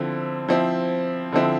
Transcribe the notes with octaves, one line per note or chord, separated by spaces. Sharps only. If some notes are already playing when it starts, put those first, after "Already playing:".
Already playing: D3 F3 C4 E4
F3 C4 E4
D3 F3 C4 E4